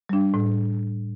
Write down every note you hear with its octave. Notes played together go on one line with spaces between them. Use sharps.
G3 D4
A2